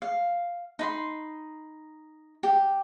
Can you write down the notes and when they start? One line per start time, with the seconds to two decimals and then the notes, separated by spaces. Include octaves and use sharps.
0.02 F5
0.79 D#4 B5 C6
2.43 G4